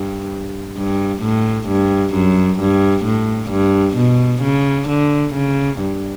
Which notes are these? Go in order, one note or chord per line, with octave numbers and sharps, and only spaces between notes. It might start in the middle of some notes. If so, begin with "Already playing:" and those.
Already playing: G2
G2
A2
G2
F#2
G2
A2
G2
B2
C#3
D3
C#3
G2